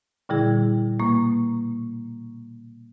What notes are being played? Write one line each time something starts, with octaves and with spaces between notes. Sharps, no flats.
A#2 D3 G3 E4 G#4
B2 A#3 C#6